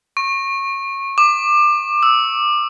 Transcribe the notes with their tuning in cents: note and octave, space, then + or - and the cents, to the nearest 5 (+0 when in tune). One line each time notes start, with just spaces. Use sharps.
C#6 -20
D6 +25
E6 -5